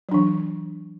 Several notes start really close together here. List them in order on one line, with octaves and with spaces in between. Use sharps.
F#3 D4 E3